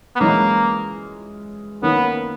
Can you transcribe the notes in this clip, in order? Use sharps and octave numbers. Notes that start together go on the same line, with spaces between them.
B3
E3 G#3 A#3 C#4
D#3 A#3 B3 C#4